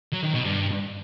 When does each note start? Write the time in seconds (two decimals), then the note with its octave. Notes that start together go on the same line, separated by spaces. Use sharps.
0.13 F#3
0.24 D#3
0.34 B2
0.44 G2